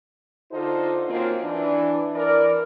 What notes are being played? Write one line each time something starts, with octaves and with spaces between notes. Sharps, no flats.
D3 D#4 F4 A4 C5
D#3 F#3 A#3 C4 C#4 F4
E3 D4
E3 A#4 D5